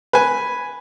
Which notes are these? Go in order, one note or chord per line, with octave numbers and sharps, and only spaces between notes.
B4 G#5